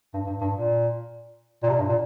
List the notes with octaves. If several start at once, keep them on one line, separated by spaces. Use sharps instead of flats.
G2
G2
G2
A#2
A#2
C3
A#2
G2
A#2